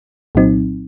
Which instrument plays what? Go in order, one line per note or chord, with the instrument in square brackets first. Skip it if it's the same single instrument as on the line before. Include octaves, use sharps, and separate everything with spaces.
[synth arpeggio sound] C2 A#2 F#3 C4 D#4